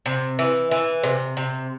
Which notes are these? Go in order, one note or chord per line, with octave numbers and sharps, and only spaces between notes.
C3
E3
E3
C3
C3